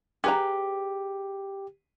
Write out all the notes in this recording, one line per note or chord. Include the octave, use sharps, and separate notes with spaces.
G4 G#4 B4 A#5